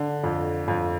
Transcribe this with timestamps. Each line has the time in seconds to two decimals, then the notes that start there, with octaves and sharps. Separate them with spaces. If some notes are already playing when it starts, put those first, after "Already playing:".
Already playing: D3
0.24 F2
0.68 F2